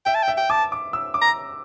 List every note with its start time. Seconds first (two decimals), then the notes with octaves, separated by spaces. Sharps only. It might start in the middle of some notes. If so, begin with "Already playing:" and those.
0.06 E5 G5
0.15 A5
0.22 G5
0.28 E5
0.37 G5
0.50 A5 D6
0.72 D6
0.93 E6
1.14 D6
1.21 A#5